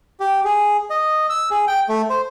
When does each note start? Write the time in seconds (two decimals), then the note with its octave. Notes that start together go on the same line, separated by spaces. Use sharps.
0.20 G4
0.45 G#4
0.90 D#5
1.30 E6
1.51 G#4
1.67 G5
1.89 A3
2.10 C5